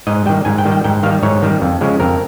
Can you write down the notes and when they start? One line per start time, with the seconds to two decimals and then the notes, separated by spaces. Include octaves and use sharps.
0.07 G#2 D#5
0.26 G3 G5
0.29 D#3
0.45 G#2 G#5
0.58 G5
0.65 D#3 G3
0.71 G5
0.84 G#2 G5
1.03 D#3 G3 F5
1.23 G#2 C#5
1.42 D#3 G3
1.61 F2
1.81 C#3 F3 G#3
2.00 F2 A#4